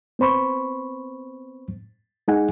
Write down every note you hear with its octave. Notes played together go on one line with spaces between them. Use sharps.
B3 C4 C5 B5 C#6
G#3 D#4 G#4 F#5 G#5